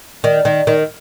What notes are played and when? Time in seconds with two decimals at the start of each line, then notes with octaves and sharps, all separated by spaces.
0.24 D#3 D5
0.45 D#3
0.67 D#3